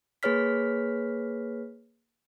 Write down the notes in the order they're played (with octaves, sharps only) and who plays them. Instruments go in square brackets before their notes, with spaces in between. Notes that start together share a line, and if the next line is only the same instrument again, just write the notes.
[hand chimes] A#3 G#4 B4 C#5 F6 B6